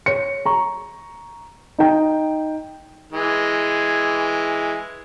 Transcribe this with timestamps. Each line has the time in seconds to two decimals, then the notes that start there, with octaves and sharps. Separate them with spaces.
0.06 C#5 C#7
0.46 A#5 C#6
1.79 D#4 G5
3.12 E3 G#3